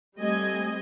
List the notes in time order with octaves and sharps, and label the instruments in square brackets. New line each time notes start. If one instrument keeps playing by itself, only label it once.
[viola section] G3 A3 C4 D#5 G#5